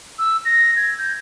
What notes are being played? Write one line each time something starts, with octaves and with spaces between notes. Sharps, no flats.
E6
A#6
G#6
G6